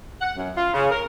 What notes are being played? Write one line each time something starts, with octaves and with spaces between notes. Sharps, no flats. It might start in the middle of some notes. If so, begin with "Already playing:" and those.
F#5
F#2
F4
C#3
A#4